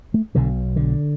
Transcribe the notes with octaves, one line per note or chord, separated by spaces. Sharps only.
A3
B1 B2 D3
D3